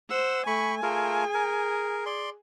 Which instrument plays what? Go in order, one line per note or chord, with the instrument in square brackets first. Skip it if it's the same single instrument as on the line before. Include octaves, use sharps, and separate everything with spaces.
[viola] C5 [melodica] F#5 E6
[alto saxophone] A3 [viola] G#5 [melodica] B5 C#6
[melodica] A3 F4 A#4 [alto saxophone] G#4
[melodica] A#4
D5 C6